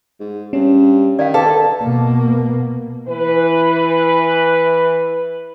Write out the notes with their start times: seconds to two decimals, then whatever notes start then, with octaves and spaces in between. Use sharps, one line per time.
0.20 G#2
0.53 G2 C#4
1.19 D#3 D5 F5
1.34 G#4 A4 B4 F5
1.82 B2 A#3
3.08 E3 B4